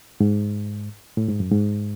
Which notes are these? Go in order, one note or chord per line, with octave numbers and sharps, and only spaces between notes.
G#2
A2
G#2
F#2
G#2